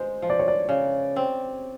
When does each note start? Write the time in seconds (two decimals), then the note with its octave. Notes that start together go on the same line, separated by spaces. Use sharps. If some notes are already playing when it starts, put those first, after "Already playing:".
Already playing: G#3 C5
0.22 F3
0.30 D5
0.39 C#5
0.48 D5
0.69 C#3
1.16 C4